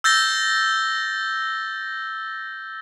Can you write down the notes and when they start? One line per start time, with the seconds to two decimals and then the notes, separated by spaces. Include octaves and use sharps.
0.04 E6 G6 A6 A#6 G7